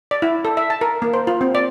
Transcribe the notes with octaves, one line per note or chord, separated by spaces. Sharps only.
D5
E4
A4
E5
A5
A#4
A#3
C5
F4
C4
D5